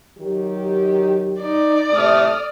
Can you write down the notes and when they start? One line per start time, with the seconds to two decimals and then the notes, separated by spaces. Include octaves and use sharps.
0.18 D#3 F#3 G4
1.42 D#4 D5
1.92 A2 C3 A3 D#6 F6